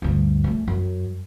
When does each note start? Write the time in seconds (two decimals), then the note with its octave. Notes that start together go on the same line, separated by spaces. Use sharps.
0.02 D2 G2
0.44 A#1 A3
0.68 F#2